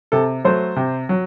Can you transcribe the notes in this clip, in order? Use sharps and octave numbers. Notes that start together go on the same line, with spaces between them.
C3 A4
F#3 A3 C5
C3
F#3